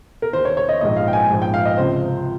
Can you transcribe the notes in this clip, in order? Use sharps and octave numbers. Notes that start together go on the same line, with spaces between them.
A#4
D#2 D#3 C5
C#5
C#5
D#5
A#1 G#2 F3 D#5
F5
G5
G#5
A#1 G#2 F3
G5
F5
D#5
C#2 C3 F3 C5